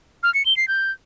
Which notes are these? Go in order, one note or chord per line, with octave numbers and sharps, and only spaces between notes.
F6
C#7
G7
C7
G6